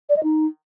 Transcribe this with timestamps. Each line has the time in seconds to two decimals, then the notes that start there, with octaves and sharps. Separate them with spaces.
0.09 D5
0.16 D#5
0.23 D#4